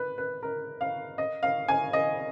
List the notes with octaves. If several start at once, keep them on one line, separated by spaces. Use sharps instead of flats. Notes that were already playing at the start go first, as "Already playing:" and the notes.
Already playing: B4
B4
A#4
F5
D#5
F5
G#5
D#5